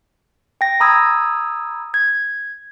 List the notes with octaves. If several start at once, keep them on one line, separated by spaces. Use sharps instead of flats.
G5 A#6
A#5 B5 D#6 E6 G#6
G#6